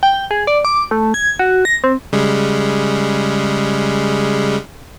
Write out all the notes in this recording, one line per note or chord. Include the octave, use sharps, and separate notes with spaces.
G5
G#4
D5
D6
A3
G#6
F#4
A#6
C4
C#3 G3 G#3